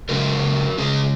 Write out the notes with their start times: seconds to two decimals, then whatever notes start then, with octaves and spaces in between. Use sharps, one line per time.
0.09 C#3 G#3 C#4 F#4 A#4
0.78 C#3 G#3 C#4 G#4